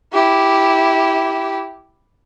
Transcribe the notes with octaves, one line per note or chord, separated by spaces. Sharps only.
E4 G4